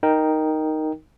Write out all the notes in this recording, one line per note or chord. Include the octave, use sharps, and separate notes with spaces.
D#4 A#4 G5